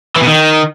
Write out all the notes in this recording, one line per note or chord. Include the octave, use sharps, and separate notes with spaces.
E3
B2
D#3